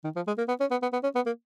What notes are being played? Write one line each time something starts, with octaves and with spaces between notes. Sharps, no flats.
D#3
F3
G#3
A#3
B3
C#4
B3
B3
B3
C#4
B3
A#3